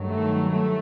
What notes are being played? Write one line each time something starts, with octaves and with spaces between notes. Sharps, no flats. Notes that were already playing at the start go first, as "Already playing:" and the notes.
Already playing: G2 D#3 F#3
A3
A3